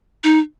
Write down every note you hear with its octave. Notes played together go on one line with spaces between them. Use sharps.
D#4